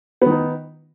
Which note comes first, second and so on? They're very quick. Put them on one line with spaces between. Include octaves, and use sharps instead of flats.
B3 D#3 D#4